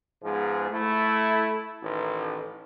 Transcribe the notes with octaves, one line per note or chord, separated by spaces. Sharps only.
G#2 F3 G#3 B3 G#4
A3 E4
A1 D#3